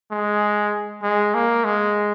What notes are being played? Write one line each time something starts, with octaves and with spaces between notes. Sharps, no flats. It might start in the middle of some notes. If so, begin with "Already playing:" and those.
G#3
G#3
A#3
G#3